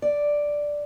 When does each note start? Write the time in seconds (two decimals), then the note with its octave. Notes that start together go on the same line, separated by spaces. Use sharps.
0.02 D5